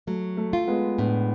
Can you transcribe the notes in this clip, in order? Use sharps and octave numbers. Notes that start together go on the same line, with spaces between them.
F#3 A3
A3
F4
G#3 B3
A2 B3 D4